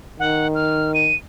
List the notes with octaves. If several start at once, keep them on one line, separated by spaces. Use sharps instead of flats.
D#3 F#5
F6
D#7